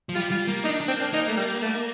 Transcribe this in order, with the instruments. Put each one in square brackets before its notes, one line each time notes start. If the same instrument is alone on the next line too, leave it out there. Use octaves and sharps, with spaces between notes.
[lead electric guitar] F3
[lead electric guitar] G3 [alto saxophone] F4
[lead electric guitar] G3 [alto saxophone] F4
[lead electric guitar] A#3
[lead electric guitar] D4 [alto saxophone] D#4
[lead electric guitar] D4
[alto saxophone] C4
[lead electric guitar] A#3 [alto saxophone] D4
[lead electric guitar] A#3 [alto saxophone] D#4
[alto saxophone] A3
G3
A3